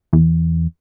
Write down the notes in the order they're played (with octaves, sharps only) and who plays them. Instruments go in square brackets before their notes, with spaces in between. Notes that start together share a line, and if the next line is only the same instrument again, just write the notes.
[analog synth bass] E2